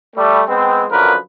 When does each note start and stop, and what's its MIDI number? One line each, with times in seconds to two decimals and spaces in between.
0.16 0.42 55
0.16 0.42 57
0.48 0.85 56
0.48 0.85 59
0.48 0.85 60
0.91 1.15 42
0.91 1.15 50
0.91 1.15 53
0.91 1.15 70
0.91 1.15 71